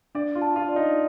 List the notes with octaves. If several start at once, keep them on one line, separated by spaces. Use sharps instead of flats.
D4 D5
F4
A5
F4
D5
D#4